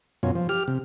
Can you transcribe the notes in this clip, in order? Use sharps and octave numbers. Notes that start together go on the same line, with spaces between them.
F#2 B2 C#4 F4
F3
G4 F6
C3